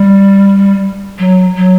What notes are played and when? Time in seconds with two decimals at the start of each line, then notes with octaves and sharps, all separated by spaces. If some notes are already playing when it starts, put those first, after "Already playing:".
Already playing: G3
1.19 F#3
1.58 F#3